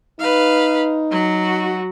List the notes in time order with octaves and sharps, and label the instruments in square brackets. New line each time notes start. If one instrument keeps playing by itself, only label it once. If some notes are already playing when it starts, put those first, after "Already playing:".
[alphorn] D#4 [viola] B4 F5
[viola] F#3 F#4